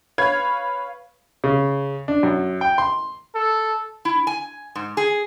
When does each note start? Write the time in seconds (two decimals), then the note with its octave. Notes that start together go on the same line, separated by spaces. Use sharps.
0.18 B4 C#5 F5 G#6
1.44 C#3
2.08 D4
2.23 F#2
2.61 G5
2.78 C6
3.35 A4
4.05 E4
4.27 G#5
4.75 G#2
4.97 G#4